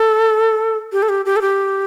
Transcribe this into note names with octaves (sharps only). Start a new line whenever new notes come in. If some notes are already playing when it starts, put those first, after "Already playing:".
Already playing: A4
G4
A4
G4
G4
A4
G4